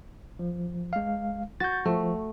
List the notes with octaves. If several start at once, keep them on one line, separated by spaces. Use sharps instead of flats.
F3
G#3 F5
F#4 G6 A6
F3 A3